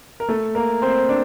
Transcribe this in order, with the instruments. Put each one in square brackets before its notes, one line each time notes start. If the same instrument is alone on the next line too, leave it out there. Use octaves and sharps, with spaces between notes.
[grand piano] A#4
A3 A4
A#3 A#4
C4 C5
D4